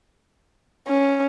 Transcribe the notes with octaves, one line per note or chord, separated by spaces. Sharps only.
C#4